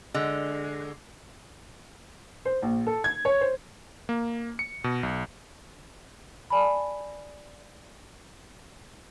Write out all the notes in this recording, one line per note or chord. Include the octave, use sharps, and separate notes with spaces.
D3 G#3
C5
A#1
A4
G#6
C#5
C5
A#3
C#7
B2
B1
D5 G#5 A5 B5